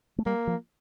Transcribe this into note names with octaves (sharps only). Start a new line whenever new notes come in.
A3
G3 A#3
F3